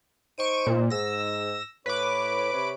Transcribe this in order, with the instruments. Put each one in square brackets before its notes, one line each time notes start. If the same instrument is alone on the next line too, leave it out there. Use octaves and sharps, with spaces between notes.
[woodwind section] D#4 C5 [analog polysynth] C#6 D7 D#7
[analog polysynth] A#2
[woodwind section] G#2 [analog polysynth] E6 A#6
[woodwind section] A2 C#5 [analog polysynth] B4 D6
[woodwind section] C3 C#5